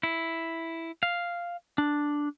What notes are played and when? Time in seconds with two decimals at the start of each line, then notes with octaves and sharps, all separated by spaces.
0.03 E4
1.03 F5
1.78 D4